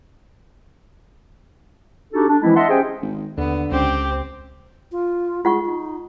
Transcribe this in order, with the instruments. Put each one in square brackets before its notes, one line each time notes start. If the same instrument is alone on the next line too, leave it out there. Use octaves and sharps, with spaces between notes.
[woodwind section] D4 D#4 F#4 G4 A4
D4
E3 F3 G#3 C4 E4
D#5 E5 F#5 A5 C6
C#4 G4 G#4 C5 D#5 G5
[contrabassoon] G#1
[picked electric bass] D#2 [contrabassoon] D3 [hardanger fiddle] B3
[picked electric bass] C#2 C#4 [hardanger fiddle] C4 C5 [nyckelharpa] G4
[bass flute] F4
[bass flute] G#3 [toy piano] F4 F#5 C#6
[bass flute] D#4